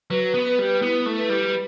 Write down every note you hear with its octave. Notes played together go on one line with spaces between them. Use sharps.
F#3 B4
B3
B4
G3
B3 E4
A3
B4
G3